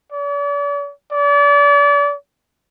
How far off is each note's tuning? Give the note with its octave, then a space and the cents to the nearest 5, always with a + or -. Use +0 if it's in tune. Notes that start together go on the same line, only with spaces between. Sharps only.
D5 -45
D5 -35